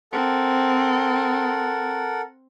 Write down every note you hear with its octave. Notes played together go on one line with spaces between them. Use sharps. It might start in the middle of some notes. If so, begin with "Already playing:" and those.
C4 A4 A#4 F#5